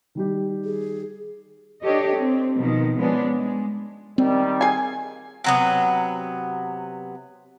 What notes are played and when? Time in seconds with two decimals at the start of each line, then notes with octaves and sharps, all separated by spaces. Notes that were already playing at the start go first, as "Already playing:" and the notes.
0.15 D#3 G3 G4
0.65 G#4
1.83 D4 G4 A4 C#5 D#5
2.14 C4
2.56 B2 D#3 F3
2.96 F3 G#3 B3 C#4 D4
3.35 G#3
4.18 D#3 G3 C4
4.61 G#4 G#5
5.44 C3 F#3 B3